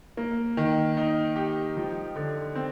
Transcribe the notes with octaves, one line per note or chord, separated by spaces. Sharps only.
A#3
D#3
D#4
G4
F3
D3
C4